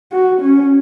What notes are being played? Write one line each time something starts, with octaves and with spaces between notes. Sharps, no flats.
F#4
C#4